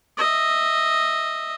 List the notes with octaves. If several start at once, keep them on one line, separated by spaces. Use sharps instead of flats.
D#5 E5